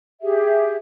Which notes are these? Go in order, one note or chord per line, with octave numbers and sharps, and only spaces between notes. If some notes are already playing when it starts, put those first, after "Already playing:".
G4 G#4 E5